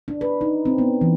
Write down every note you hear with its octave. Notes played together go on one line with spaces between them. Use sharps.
D4
B4
D#4
C4
B3
E3